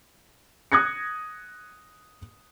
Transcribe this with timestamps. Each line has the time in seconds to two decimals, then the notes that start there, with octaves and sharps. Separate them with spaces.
0.72 D#6 F#6 G#6 A#6 C#7